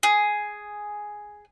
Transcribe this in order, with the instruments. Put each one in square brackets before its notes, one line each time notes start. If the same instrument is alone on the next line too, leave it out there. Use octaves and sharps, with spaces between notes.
[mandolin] G#4